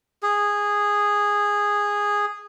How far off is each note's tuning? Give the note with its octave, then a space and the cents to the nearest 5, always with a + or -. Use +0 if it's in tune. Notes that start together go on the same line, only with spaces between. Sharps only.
G#4 -10